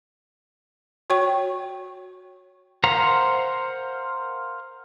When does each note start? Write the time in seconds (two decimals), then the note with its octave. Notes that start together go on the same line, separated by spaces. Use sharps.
1.10 F#4 C#5 G5 C#6
2.84 A#4 C5 F5 F#5 A#5